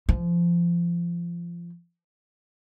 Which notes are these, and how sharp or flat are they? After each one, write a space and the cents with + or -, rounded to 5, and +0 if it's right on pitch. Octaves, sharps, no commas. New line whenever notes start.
F3 -25